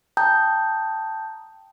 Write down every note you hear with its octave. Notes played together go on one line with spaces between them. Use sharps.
G5 A5 A#5 D#6 G6